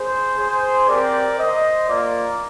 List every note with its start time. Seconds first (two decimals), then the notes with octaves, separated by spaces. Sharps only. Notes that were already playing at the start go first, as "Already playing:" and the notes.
Already playing: G#4 C5
0.38 G#4 C5
0.88 C4 G4 A#4 D5
1.38 C5 D#5
1.87 A#3 F4 A#4 D5